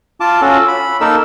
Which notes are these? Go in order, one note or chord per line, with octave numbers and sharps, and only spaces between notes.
F4 A5 D6
C#4 F4 F#4 A4
B5
A#3 D#4 A4 A#4 E6